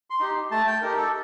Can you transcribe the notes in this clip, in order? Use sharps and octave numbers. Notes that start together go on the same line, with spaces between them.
C6
D#4 G4
A3 A5
G5
D#4 G4 A#4
A4